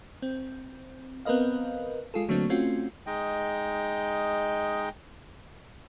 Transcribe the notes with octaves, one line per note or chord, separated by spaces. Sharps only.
C4
B3 C4 A#4 B4 D#5 F5
G#3 F4 G#4 A4
D3 F#3 A3 A#3 C4 D4
A3 C4 C#4 F4 F#4
G#3 D#4 D#5 G5